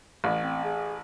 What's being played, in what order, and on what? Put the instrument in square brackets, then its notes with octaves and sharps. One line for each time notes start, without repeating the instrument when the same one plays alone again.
[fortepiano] A1
[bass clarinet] C4
G#4